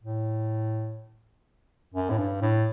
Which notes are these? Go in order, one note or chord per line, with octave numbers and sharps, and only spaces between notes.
A2
F#2
A2
G2
A2